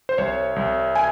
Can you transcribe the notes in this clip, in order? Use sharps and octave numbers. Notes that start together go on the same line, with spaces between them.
C5
C2 C#5
C2
G#5